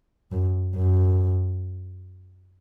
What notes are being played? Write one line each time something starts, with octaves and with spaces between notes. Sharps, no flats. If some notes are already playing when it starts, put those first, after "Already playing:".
F#2
F#2